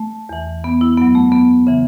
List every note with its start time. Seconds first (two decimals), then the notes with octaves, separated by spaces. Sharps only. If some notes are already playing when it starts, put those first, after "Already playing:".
Already playing: A3
0.29 E2 E3
0.64 B3
0.81 E4
0.97 F#2 F#3 B3
1.15 A3
1.32 B3
1.67 C#3 E3